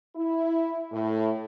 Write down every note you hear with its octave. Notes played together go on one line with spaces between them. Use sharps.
E4
A2